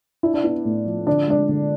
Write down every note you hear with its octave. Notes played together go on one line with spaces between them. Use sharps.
D4 E4
D4
B3 E4
A2
F3
D3 D4
G#3 D4
D3